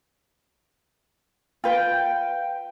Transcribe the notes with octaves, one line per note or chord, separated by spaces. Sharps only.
F4 B4 G5